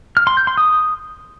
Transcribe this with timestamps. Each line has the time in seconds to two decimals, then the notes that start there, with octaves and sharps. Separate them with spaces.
0.17 F6
0.27 C6
0.37 G6
0.47 C6
0.57 D#6